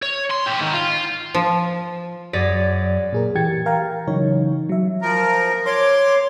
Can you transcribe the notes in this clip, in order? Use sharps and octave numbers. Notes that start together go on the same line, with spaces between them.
C#5
C6
C#4 G4
G#2 D#3
F4
F3
F#2 C#4 G#4 D5 A#6 B6
A#2 G#4 A#4
E3 G4 G5 G#6 A6 C#7
A#4 F5 G5 A#5
C#3 E3 F#3 D#4 C#5
F#3 E5
F3 A#4
C#5 C6 D6